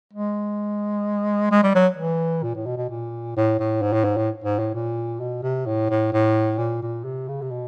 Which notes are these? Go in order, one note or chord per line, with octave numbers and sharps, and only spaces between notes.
G#3
G#3
G3
F#3
E3
A#2
A2
B2
B2
A#2
A2
A2
G#2
A2
G#2
A2
G#2
A2
A#2
B2
C3
A2
A2
A2
A#2
A#2
C3
C#3
C3
B2